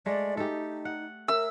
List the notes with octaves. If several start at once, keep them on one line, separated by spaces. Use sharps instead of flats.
G#3 A3 D5
D#4 G4 A4
F#5
A#4 E5 E6